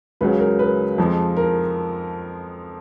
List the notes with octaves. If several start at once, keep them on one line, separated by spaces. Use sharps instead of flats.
C#2 C#3 F#3 B4
A#4
B4
F2 F3 G#3
A#4